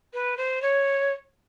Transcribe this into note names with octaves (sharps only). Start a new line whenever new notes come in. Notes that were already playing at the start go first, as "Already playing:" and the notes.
B4
C5
C#5